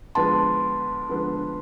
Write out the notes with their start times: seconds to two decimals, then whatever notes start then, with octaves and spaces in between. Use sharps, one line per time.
0.15 D3 F3 G#3 B3 A5 C6
1.10 D3 F3 G#3 B3